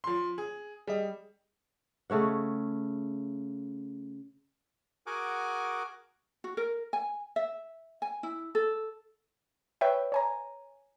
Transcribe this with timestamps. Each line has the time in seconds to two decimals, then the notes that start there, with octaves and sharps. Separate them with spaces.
0.04 F3 C6
0.38 G#4
0.87 G3 G#4 D#5
2.10 C#3 A3 C#5 F#5
5.07 F#4 G#4 A#4 F#5 G#5 D6
6.44 F#4
6.57 A#4
6.93 G#5
7.36 E5
8.02 G#5
8.23 E4
8.55 A4
9.81 B4 C#5 E5 G5
10.12 C#5 G#5 A#5